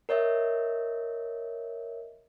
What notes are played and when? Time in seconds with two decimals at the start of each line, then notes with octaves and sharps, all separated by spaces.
0.09 A#4 C#5 D#5 E5